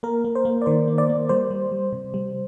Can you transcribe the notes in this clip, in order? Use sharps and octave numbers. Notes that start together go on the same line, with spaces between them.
A#3 A#4
A#3
C5
A#3
D5
D#3 C5
A#3
D5
A#3
G3 C5
G3
G3
C3
G3